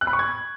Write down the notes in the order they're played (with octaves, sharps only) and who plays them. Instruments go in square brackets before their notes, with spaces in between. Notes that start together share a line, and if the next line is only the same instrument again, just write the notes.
[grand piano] F#6
B5
C#6
G#6